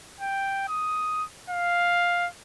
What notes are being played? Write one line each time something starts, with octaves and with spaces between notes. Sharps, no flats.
G5
D#6
F5